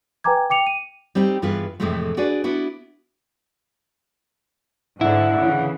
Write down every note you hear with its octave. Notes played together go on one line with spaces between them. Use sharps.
B4 G5 G#5 A#5 D6 G#6
G5 D6 C#7 F7
D#7
G3 C4 D#4 G4
G2 E3 B3 F4 G#4 B4
F2 A2 C3 E3 G#3 A3
D4 F#4 G#4 B4 D5
B3 D4 E4 F#4
G#2 D3 E4 F#5
C#3 E3